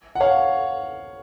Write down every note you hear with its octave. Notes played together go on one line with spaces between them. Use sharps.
F#5
C#5 F5